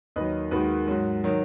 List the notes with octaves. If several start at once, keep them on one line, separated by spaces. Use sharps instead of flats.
D#2 D#3 F#3 B4 D#5
D#2 D#3 G#3 F#4 B4
G#2 F#3 F#4
D#3 F#3